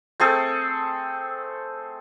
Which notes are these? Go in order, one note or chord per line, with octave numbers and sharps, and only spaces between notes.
A3 C4 G#4 A4